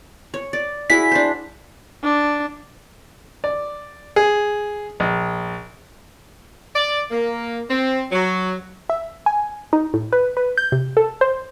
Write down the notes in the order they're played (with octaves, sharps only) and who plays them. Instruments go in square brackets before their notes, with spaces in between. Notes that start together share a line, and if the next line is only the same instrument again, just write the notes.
[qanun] C#5
D5
[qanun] E4 F#4 G#4 [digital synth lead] B6
[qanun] D4 C5
[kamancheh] D4
[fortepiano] D5
G#4
A#1
[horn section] D5
A#3
C4
F#3
[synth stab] E5
G#5
D#4
A2
B4
B4
G6
C3
A4
C5